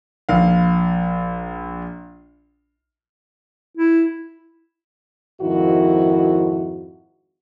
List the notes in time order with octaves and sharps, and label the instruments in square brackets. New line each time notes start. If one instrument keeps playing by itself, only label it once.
[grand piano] A#1 F5
[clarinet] E4
[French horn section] F2 G#2 D#3 E4 F#4